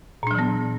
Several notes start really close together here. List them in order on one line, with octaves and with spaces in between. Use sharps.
A#2 D4 F#3 E3 B3